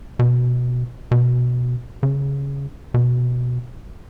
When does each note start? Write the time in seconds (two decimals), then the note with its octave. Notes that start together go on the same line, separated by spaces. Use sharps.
0.19 B2
1.11 B2
2.03 C#3
2.94 B2